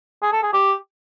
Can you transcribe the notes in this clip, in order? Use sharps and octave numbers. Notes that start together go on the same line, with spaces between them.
G#4
A4
G#4
G4